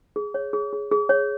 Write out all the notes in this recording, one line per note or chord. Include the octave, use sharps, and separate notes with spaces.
G#4
C#5
G#4
G#4
G#4
C#5